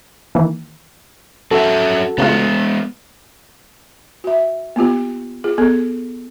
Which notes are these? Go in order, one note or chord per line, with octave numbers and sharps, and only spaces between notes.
D#3 E3 A#3
F#3 C#4 F#4 A4 E5
C#3 G#3 A3 B3 F4
F#4 E5
A#3 B3 F4 G4
F4 G#4
B3 G#4 A4